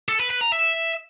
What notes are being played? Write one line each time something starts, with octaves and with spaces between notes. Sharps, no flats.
A4
B4
B4
A#5
E5